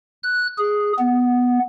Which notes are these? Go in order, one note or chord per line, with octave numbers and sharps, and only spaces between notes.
F#6
G#4
B3